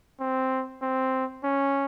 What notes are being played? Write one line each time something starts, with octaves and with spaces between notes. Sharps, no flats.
C4
C4
C#4